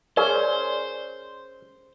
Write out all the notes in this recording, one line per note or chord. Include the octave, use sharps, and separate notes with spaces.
C#4 G#4 A#4 C5 D5